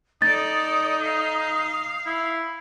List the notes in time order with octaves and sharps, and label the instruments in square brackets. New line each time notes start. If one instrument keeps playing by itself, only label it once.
[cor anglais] D#4 [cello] A4 D5 [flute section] D#6 [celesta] A6
[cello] F5
[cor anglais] E4